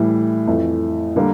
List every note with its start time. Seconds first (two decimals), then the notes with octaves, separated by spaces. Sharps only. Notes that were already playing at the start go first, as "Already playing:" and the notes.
Already playing: A2 E3 G3
0.47 F2 E3 A3
1.16 D3 G3 A#3